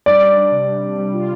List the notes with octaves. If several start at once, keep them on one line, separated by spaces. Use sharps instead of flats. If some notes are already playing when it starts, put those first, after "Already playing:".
G3 D5
D4
G3
C3
G3
G3
G3
F4